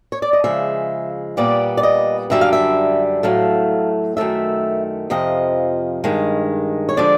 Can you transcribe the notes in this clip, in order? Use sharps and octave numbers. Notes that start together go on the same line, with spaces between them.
C#5
D5
D#5
C#3 F3 G#3 E5
A#2 G3 B3 D5
D5
D#5
F#2 D3 G3 E5
F5
E5
A2 F#3 A3 F5
F#2 D#3 F#3 A3 E5
F2 C3 F3 D#5
G2 D#3 G#3
C#5
D3 F3 G#3 D5